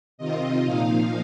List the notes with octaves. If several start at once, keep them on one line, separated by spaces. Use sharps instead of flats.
C3 D#3 C4 F4 D#5
A#2 F3 A#3 D#4 F5